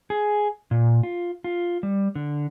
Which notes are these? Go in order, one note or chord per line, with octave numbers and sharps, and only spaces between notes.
G#4
A#2
F4
F4
G3
D3